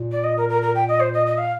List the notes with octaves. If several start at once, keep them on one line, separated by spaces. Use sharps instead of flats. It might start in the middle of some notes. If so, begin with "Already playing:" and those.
Already playing: A#2
D5
D#5
A#4
A#4
A#4
G5
D#5
C5
D#5
D#5
F5